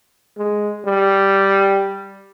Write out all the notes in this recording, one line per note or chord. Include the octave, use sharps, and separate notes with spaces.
G#3
G3